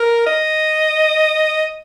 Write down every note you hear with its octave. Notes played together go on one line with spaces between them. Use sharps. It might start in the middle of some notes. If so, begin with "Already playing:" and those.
Already playing: A#4
D#5